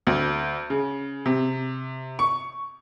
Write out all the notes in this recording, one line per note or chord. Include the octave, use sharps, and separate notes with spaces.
D2
C#3
C3
C#6